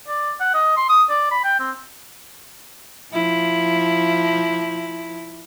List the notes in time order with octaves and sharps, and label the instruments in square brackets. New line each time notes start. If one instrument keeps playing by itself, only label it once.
[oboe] D5
F#5
D#5
C6
D#6
D5
B5
G5
C4
[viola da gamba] F3 E4